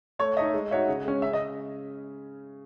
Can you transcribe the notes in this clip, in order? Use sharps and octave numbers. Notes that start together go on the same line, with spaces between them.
A3 C#5
D#4 A4 C#5 D#5 E5
G#3
D#4 F#4 C#5 E5
C#3
G#3 C#4
C#3 E5
D#5